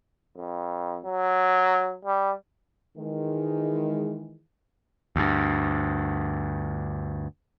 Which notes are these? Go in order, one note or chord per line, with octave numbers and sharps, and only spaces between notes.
F2
F#3
G3
D#3 E3 G#3
D2 G2